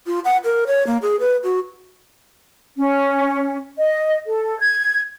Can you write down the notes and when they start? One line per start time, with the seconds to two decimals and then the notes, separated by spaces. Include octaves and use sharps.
0.07 F4
0.25 F#5
0.44 A#4
0.67 C#5
0.87 A#3
1.02 G#4
1.20 B4
1.44 F#4
2.77 C#4
3.78 D#5
4.27 A4
4.60 G#6